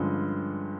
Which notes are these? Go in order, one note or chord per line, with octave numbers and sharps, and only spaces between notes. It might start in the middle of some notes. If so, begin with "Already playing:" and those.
Already playing: G2 D3 F3 G#3 C#4